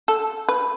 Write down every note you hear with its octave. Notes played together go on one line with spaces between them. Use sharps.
A4
B4